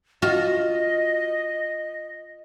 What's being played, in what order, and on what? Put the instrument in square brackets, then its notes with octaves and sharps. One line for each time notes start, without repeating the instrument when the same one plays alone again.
[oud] F4 F#4 [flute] D#5